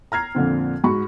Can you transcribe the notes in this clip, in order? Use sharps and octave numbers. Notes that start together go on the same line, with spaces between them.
A#5 F6 G#6 C7
F2 A#2 D3 C4
G#2 F#4 B5 C#6